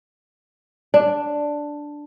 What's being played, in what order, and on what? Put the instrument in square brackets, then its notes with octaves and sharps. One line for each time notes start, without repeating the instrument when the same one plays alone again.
[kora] D4